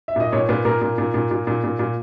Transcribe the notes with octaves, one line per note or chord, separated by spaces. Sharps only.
E5
A#2 D#5
A#2 C#5
A#2 B4
A#2 A#4
A#2
A#2
A#2
A#2
A#2
A#2
A#2